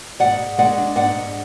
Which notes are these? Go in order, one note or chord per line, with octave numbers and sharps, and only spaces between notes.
G#2 D5 F#5
G#2
G#3 D5 F#5
D4
G#2 D5 F#5
G#2